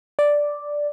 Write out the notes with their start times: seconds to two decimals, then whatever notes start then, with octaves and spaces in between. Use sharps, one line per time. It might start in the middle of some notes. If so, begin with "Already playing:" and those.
0.19 D5